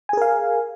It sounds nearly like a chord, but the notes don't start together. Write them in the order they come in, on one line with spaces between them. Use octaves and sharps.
G#5 G#4 A#4 F5